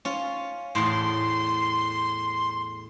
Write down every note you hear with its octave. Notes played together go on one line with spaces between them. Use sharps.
C#4 F4
E2 A2 C6